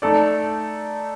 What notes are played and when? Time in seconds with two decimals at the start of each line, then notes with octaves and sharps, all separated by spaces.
0.02 A3 D#4 A4 D5